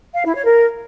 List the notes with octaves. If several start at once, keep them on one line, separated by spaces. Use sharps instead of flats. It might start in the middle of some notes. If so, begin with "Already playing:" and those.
F5
E4
C#5
A#4